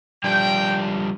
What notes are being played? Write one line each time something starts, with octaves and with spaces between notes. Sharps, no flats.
F3 G3 D4 G5